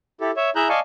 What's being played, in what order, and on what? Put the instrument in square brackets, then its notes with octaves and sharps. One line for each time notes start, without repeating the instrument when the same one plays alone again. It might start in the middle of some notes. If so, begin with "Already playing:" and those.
[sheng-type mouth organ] E4 G4 A4
C#5 E5
E4 G#4 E5 A#5 F#6 G6
D5 D#5 F5 G#5 A5 C#6